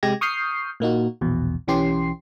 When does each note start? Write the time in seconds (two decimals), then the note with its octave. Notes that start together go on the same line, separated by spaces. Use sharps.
0.03 C3 G#3 G4 G#6 A#6
0.21 C#6 D#6 F6 G6 C7
0.80 A#2 A#3 D#4 F#4
1.21 A#1 E2 B2
1.68 B1 E3 C#4 G4 C6 C7